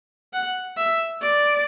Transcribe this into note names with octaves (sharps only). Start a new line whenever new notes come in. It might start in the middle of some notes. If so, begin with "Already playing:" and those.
F#5
E5
D5